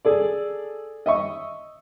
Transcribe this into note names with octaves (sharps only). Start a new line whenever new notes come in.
G#4 A4 D5
D#5 E5 C#6